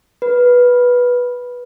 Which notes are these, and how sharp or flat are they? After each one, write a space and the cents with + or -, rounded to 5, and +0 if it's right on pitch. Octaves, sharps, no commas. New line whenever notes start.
B4 -10